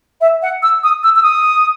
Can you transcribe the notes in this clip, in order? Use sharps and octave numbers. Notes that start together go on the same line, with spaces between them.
E5
F#5
E6
D#6
E6
E6
D#6